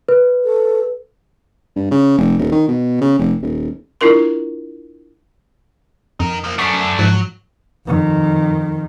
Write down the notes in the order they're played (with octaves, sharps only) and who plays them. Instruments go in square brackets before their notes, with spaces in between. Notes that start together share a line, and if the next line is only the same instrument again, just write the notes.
[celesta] B4
[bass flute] A4
[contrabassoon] G2
C#3
F1
D#1
D#3
B2
C#3
F1
D#1
[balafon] D4 E4 F4 A#4 C6
[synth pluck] F2 [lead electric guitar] D#4 A#4
[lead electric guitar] F3 A#3
[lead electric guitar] F#2 [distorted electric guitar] A3 D4 [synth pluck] C#6 B6 C7
[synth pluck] G#2 F3 [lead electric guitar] F#3
[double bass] F2 D#3